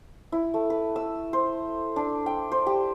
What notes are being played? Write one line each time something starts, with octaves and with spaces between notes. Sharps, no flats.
E4
A3
B4
E6
C5
D4
G5
C5
G4